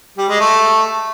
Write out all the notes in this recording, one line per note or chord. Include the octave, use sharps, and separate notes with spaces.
G3
G#3
A3